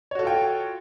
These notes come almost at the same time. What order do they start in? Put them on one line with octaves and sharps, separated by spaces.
C#5 F#4 A4 F4 G5